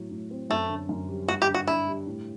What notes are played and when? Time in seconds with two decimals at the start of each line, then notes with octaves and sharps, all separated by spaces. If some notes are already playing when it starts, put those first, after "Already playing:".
Already playing: A2 F#3
0.11 A2
0.31 C4
0.50 F#2 A3
0.69 D3
0.89 F#2
1.09 G3
1.28 G2 F#4
1.42 G4
1.48 D3
1.54 F#4
1.67 D4 E4
1.87 G3
2.07 A2